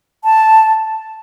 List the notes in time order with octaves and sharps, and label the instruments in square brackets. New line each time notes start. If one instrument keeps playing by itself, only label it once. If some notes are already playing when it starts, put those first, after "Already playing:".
[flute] A5